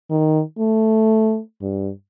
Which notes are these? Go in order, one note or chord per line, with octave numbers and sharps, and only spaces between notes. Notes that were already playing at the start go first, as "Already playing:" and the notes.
D#3
A3
G2